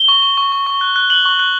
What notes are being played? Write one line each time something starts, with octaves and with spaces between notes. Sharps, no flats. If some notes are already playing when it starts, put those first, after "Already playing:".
Already playing: G7
C#6
C#6
C#6
C#6
C#6
F#6
F#6
F#6 F#7
C#6
F#6